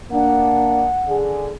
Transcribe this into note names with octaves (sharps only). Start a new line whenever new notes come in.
A#3 D4 F#5
D3 G#4